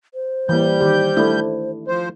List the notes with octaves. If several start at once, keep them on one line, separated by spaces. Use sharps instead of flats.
C5
E3 G3 A#3 G6
D#3 G4
A3 D4 E4
F3 C5